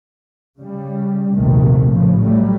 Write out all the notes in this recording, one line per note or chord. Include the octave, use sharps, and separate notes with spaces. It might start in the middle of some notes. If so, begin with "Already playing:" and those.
C#3 G3
A#1 D#2 C3 D#3 A3
A2 C#3 F3
F#3 G3 A3